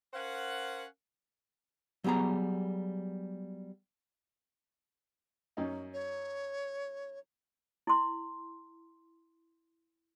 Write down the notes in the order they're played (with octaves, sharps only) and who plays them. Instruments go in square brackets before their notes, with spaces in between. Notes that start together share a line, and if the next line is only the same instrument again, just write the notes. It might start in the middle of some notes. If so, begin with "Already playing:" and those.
[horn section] C#4 A#4 C5 F5 F#5
[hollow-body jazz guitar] F#3 G3 B3 G#4 A#5
[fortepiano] F#2 C#4 D#4
[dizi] C#5
[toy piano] E4 C6